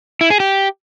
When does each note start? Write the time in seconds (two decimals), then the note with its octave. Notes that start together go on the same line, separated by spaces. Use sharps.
0.21 E4
0.30 G#4
0.40 G4